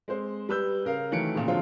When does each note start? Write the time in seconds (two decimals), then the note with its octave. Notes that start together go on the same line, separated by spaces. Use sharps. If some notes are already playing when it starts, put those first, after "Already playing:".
0.08 G#3 C4 C5
0.49 G3 B4 E6 G6
0.85 C#3 A#4 F5
1.12 D#3 E3 F#3 A3 C#7 D7
1.35 A#2 C#3
1.48 D3 F3 F#3 G#3 C4 F4